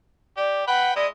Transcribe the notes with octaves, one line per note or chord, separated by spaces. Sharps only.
G4 D5
B4 F#5 G5 B5
G#3 E4 D5 D#5